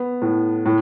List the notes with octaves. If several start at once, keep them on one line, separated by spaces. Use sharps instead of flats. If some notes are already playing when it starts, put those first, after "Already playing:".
Already playing: B3
A2
A2